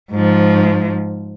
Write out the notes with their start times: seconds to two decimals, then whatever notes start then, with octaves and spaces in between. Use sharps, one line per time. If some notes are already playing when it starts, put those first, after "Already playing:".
0.11 G#2 F3